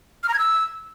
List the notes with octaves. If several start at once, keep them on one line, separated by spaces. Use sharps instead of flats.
F6
A#5
G#6
E6